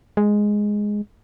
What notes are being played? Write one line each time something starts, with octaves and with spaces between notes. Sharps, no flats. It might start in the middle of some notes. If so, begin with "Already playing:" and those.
G#3